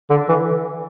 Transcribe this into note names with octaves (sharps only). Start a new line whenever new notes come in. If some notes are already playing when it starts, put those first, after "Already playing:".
D3
E3